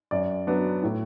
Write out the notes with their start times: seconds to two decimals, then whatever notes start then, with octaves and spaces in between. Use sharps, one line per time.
0.11 F#2 D5
0.47 F#3 B3 D4
0.83 A2